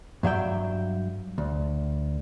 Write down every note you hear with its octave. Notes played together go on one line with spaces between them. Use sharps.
G2 F#3 E5 G5
D2